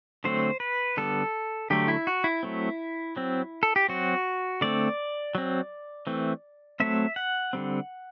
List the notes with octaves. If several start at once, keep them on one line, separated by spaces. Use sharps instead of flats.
D3 F#3 A3 C4 C5
B4
D3 G3 B3 A4
D3 F#3 A3 G4
E4
F#4
E4
F#3 A3 C4
F#3 C4
A4
G4
F#3 C4 F#4
D3 A3 C4 D5
F#3 C4
E3 A3 C4
F#3 A3 C4 E5
F#5
D3 G3 C4